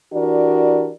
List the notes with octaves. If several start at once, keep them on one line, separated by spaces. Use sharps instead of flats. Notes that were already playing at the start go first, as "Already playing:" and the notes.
E3 D4 F#4 G4 A#4 D5